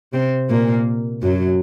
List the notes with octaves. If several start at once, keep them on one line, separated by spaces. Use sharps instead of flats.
C3 C4
A#2 A#3
F#2 F#3